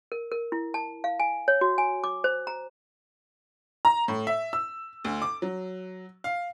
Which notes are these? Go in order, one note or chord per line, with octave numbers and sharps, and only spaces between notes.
A#4
A#4
E4
A5
F5
G#5
C#5
F#4
G#5
D6
C5
A#5
A#5
A2
E5
E6
D2
D6
F#3
F5